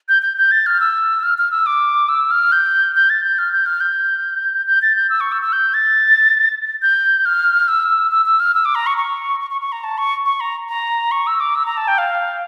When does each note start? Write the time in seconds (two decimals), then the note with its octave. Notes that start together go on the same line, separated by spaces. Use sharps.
0.09 G6
0.22 G6
0.38 G6
0.51 A6
0.66 F6
0.81 E6
1.23 F6
1.38 F6
1.51 E6
1.66 D6
2.09 E6
2.31 F6
2.52 G6
2.95 G6
3.10 A6
3.24 G6
3.39 F6
3.52 G6
3.66 F6
3.80 G6
4.67 G6
4.82 A6
4.96 G6
5.10 E6
5.21 C#6
5.32 E6
5.42 E6
5.53 G6
5.74 A6
6.82 G6
7.25 F6
7.68 E6
8.11 E6
8.26 E6
8.40 F6
8.54 E6
8.65 D6
8.75 A#5
8.86 C#6
8.98 C#6
9.40 C#6
9.51 C#6
9.61 C#6
9.72 A#5
9.84 A5
9.98 C#6
10.25 C#6
10.40 A#5
10.68 A#5
11.11 C#6
11.27 E6
11.40 D6
11.55 E6
11.66 A#5
11.77 A5
11.88 G5
11.98 F5